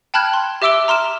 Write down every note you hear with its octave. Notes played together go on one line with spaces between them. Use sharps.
G5 A5 B5 F6 F#6 G#6
C6
G4 E5 D6 E6 D7 G7
A#5 C6 F6 E7